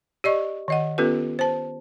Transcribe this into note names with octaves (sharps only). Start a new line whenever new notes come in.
G4 D5 D#5 C#6
D#3 D#5 F#5
B3 C#4 F4 G4 A4 B4
C5 A5